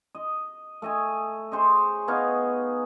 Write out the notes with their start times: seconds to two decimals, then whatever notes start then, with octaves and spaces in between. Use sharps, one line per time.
0.15 D#5
0.82 A3 D#5 G#5
1.52 G#4 C5 C#5 D#5
2.08 B3 D#4 C#5 F5